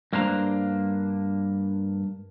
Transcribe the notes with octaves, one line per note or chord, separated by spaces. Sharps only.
G2 A#3 D4 C5 A#5